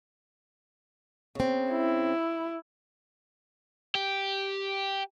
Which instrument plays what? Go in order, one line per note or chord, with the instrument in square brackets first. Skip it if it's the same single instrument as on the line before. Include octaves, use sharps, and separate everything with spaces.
[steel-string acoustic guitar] C#3 C4
[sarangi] E4
[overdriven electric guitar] G4